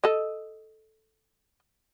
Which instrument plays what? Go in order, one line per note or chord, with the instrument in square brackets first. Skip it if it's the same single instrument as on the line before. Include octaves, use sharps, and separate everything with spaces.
[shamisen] A4 D#5